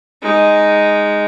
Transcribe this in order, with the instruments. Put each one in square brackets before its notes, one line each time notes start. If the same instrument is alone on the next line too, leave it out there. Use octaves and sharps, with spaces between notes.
[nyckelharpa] G#3 D#4